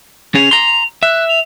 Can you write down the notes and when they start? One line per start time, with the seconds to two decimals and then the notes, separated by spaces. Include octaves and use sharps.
0.35 C#4 G#4 F7
0.51 A#5 C6
1.03 E5 F#6
1.29 F7